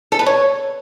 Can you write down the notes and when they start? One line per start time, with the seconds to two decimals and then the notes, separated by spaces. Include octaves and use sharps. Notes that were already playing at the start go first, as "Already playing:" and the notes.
0.12 A4
0.19 B4
0.26 C#5